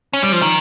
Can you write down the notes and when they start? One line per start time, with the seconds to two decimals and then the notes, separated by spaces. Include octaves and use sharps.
0.13 C#4
0.23 G3
0.32 F3
0.42 D#3